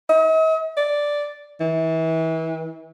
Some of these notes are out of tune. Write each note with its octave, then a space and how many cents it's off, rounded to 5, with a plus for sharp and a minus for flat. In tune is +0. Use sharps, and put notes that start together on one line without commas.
D#5 +45
D5 -5
E3 -30